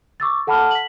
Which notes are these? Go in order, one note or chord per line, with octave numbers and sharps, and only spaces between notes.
C#6 D6 E6 A6
A4 F#5 A5 B5 D6 F6
B6 F#7